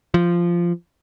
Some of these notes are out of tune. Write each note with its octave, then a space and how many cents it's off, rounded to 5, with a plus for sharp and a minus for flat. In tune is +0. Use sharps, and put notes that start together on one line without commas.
F3 -10